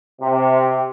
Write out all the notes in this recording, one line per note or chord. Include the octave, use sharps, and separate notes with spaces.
C3